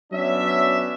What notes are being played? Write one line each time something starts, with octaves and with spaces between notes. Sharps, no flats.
F#3 B3 C#4 D4 E5